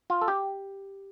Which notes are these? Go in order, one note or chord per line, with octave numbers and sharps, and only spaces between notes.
F4
A4
G4